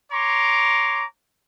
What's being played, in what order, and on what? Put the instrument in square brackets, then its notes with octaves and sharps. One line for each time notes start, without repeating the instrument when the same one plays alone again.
[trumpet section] C#5 A#5 C6 D6